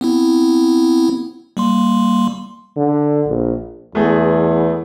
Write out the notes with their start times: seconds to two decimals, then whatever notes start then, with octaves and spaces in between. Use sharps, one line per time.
0.01 B3 C4 E4
1.57 G3 A#3 C6
2.77 D3
3.28 A#1
3.95 E2 A3 B3 G#4